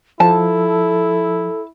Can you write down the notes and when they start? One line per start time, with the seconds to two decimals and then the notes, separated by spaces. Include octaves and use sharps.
0.20 F3 E4 A4 A5